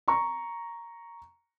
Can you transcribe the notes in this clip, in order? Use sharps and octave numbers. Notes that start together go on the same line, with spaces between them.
A#5 C#6